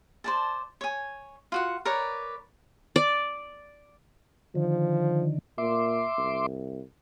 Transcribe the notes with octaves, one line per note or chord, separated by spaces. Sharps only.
C5 D5 A5
C#5 G#5
F4 F#4 F#5
A#4 B4 C#5 D5
D5
D3 D#3 F3
A#2 E5 C6 D6
C2